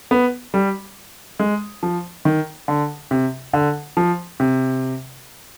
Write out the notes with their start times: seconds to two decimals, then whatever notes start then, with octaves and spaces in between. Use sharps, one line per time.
0.11 B3
0.54 G3
1.39 G#3
1.83 F3
2.25 D#3
2.68 D3
3.11 C3
3.53 D3
3.97 F3
4.40 C3